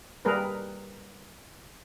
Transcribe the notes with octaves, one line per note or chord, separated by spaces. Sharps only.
G3 A#3 G#4 A#4 B4